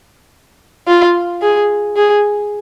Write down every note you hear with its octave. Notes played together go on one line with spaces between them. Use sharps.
F4
G#4
G#4